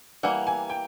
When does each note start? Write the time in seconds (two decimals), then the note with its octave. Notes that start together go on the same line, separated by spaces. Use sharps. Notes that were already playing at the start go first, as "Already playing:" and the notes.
0.23 E3 G3 A#3 F#5
0.47 G#5
0.70 G5